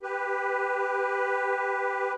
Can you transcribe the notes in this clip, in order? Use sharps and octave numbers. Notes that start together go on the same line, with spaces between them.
G4 B4